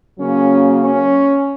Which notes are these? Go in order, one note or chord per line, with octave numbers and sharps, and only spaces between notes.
C#3 F#3 A#3 C#4
C#4